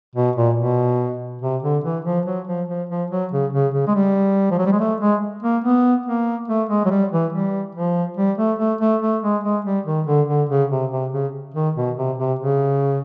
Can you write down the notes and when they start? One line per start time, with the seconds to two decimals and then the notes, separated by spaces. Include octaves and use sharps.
0.15 B2
0.36 A#2
0.57 B2
1.42 C3
1.63 D3
1.84 E3
2.05 F3
2.26 F#3
2.47 F3
2.68 F3
2.89 F3
3.11 F#3
3.32 C#3
3.53 C#3
3.74 C#3
3.87 G#3
3.95 G3
4.51 F3
4.59 F#3
4.66 G3
4.72 G#3
4.79 A3
5.01 G#3
5.43 A#3
5.64 B3
6.06 A#3
6.48 A3
6.69 G#3
6.85 F#3
6.90 G3
7.12 E3
7.33 G3
7.75 F3
8.17 G3
8.38 A3
8.59 A3
8.81 A3
9.02 A3
9.23 G#3
9.44 G#3
9.65 G3
9.86 D#3
10.07 D3
10.28 D3
10.49 C#3
10.71 C3
10.91 C3
11.12 C#3
11.54 D#3
11.76 B2
11.97 C3
12.18 C3
12.39 C#3